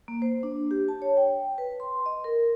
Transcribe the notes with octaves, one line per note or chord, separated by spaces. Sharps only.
A#3
C5
D4
G4
A5
C#5
G5
B4
C6
D#5
A#4